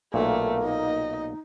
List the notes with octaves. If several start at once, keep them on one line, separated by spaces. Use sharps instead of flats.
B1 A#2 A3 A#3
D#4 D#5